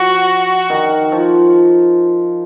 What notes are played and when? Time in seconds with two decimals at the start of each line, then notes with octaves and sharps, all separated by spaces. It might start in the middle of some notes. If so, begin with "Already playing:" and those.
Already playing: F3 F#4
0.70 D#3
1.12 F3